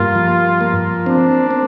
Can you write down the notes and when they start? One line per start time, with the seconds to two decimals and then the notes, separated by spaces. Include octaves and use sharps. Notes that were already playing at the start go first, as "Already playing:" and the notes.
Already playing: G2 A#3 F4
0.15 F3
0.61 A#3
1.06 C4 D4
1.51 C4